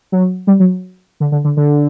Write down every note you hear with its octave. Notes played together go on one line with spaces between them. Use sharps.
F#3
G3
F#3
D3
D3
D3
D3